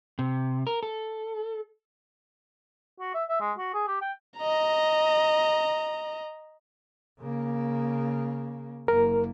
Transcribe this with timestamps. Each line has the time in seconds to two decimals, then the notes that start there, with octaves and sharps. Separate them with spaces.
0.19 C3
0.67 A#4
0.83 A4
3.00 F#4
3.14 E5
3.29 E5
3.40 G#3
3.58 F#4
3.74 G#4
3.88 G4
4.01 G5
4.38 D#5 A#5
7.19 C#3 A#3
8.88 F#1 A#3 A#4